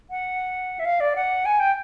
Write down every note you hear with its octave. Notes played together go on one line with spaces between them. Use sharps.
F#5
E5
F5
D5
F#5
G#5
G5